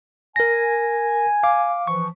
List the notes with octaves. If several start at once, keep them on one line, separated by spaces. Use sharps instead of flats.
A#4 G#5 A#6
F5 D6
E3 F3 C#6